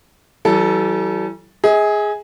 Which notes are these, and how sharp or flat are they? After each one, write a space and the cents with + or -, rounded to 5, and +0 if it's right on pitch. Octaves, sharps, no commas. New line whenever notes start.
E3 +0 G3 -40 A4 +0
G#4 +0 D#5 +45